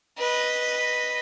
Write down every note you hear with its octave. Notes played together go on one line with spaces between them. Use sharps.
B4 D#5